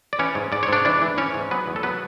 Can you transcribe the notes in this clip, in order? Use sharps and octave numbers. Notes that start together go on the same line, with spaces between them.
D5
E3 C#4 C#5
G#2
G#2 D5
C#5
G#2 D4 D5
E3 D4 D5
E3
E3 C#4 C#5
G#2
F#3 B3 B4
E2
A4
F#3 B3 B4